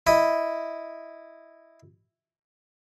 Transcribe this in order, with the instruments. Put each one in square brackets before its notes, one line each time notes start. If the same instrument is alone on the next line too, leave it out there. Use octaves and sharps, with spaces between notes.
[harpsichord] E4 D#5